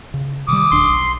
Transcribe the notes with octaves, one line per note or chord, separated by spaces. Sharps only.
C#3
C3 D#3 G3 D6 D#6
D#1 D4 C6
B1